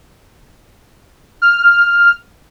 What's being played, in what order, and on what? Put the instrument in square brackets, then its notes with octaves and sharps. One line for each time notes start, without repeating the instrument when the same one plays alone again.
[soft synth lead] F6